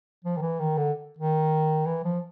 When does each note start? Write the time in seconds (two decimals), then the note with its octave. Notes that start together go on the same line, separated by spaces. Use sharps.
0.24 F3
0.37 D#3
0.42 E3
0.60 D#3
0.77 D3
1.19 D#3
1.86 E3
2.04 F3